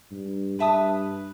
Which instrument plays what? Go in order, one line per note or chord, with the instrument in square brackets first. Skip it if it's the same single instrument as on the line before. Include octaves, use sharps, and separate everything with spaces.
[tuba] G2
[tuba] G2 [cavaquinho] B4 E5 A5 D#6